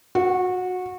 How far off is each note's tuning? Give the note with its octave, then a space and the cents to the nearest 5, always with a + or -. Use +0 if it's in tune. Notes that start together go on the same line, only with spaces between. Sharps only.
F#4 -20